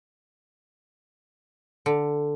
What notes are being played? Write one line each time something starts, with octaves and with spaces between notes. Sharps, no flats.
D3